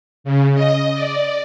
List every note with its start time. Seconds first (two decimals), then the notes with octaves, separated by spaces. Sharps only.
0.24 C#3
0.54 D#5
0.94 D5